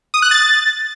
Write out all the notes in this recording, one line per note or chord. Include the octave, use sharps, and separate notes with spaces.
D#6
F#6
A6